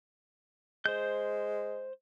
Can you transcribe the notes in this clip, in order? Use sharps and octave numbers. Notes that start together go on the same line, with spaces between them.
G#3 C5 G6